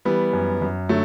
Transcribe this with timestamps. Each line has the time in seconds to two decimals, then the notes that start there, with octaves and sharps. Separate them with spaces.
0.05 E3 G3 B3
0.33 F#2
0.62 F#2
0.89 D3 F#3 A3